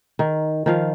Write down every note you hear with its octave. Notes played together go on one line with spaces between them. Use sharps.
D#3
D#3 F3 F5